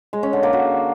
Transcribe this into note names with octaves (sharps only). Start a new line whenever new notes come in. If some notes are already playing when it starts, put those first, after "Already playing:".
G#3
C#4
D3
A#3
F#4